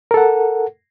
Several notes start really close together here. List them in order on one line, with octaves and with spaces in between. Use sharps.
A#4 A4 F#5